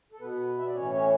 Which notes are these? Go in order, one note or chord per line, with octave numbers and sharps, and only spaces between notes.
A4
B2 B3 B4
E5
D5
A2 E3 C#4 C#5
C#4 C#5